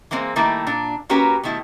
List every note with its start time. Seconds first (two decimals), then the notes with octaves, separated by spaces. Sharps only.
0.11 E3 G#3 A#3 C4
0.36 D#3 G3 A3 A#3 E4
0.67 A#2 D4
1.09 A#3 C#4 F#4 G4 A#4 B4
1.43 B2 D#3 A3 E4